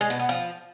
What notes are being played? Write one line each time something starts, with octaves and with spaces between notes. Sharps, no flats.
G#3
B2
B3
F3